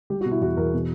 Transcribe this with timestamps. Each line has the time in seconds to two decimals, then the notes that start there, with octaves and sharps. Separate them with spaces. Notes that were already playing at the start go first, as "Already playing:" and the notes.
0.10 G3 G4
0.21 F#4
0.25 B2
0.31 E4
0.41 E2 F#4
0.57 E2 A#4
0.74 B2